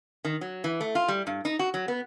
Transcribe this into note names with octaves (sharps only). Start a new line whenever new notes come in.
D#3
F#3
E3
A3
F4
G3
G2
D#4
F#4
F#3
B3